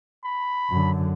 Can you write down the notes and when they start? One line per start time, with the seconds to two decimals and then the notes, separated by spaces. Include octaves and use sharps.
0.24 B5
0.69 F#2 D3